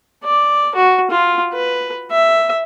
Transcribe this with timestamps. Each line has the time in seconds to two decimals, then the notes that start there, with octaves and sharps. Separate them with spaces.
0.24 D5
0.75 F#4
1.10 F4
1.53 B4
2.11 E5